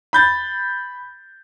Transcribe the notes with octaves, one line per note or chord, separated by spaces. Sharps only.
B5 G6 A6